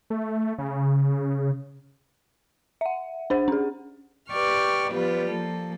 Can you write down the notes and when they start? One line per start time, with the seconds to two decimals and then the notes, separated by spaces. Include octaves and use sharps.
0.10 A3
0.58 C#3
2.81 E5 F#5
3.30 D4 C5 F#5
3.48 C#4 G#4
4.30 G4 B4 D5 G5 C#6 F6
4.91 F3 G3 B3 F4 G4 B4
5.28 F3 A#3 A4